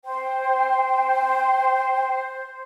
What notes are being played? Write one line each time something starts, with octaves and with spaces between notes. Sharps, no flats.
C5 G5